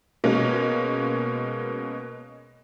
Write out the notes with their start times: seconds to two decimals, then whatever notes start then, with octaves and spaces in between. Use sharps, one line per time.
0.24 B2 G#3 A#3 C#4